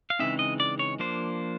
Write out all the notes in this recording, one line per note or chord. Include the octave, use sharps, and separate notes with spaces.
F5
C#3 E3 G#3 C4 D#4 E5
D#5
D5
C#5
F3 A#3 D4 C5